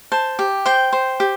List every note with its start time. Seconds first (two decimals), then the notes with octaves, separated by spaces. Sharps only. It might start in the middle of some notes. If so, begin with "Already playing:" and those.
0.12 C5 A5
0.39 G4
0.66 C5 G5
0.93 C5
1.20 G4